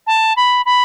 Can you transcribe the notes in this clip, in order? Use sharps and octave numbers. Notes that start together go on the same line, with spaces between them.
A5
B5
B5